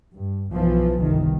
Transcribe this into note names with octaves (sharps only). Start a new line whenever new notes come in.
G2
B1 E3 F3
G1 C2 D#3